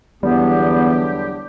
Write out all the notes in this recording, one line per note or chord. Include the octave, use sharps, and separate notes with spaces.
E2 D3 F#3 G3 B3 G4